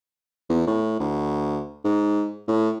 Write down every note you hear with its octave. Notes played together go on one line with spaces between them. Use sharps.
E2
A2
D2
G#2
A2